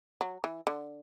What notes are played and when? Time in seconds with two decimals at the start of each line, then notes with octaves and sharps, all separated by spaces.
0.21 F#3
0.44 E3
0.67 D3